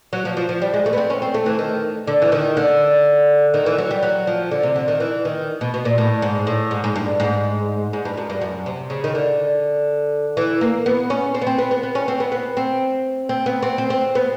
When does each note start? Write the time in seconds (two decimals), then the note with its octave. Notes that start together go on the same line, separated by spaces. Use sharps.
0.13 F#3
0.25 F3
0.37 F3
0.49 F3
0.62 G3
0.74 G#3
0.86 A3
0.93 B3
0.98 C4
1.10 C#4
1.22 C4
1.34 A3
1.46 E3
1.59 D#3
2.07 D3
2.22 E3
2.32 D#3
2.57 D3
3.54 D#3
3.66 E3
3.78 F#3
3.91 G3
4.03 F#3
4.27 F3
4.51 D3
4.63 C3
4.76 D3
4.88 D#3
5.00 E3
5.25 D#3
5.61 B2
5.74 B2
5.85 A#2
5.98 A2
6.22 G#2
6.47 A2
6.71 G#2
6.84 G#2
6.96 G2
7.20 G#2
7.93 G#2
8.05 G2
8.17 F#2
8.30 G2
8.42 F#2
8.66 C3
8.90 C#3
9.04 D#3
9.15 D3
10.37 E3
10.61 A#3
10.86 B3
11.10 C#4
11.35 C4
11.41 B3
11.47 C4
11.58 B3
11.71 B3
11.83 B3
11.95 C#4
12.08 C4
12.20 B3
12.32 B3
12.57 C4
13.29 C4
13.46 B3
13.63 C4
13.78 C4
13.90 C4
14.15 B3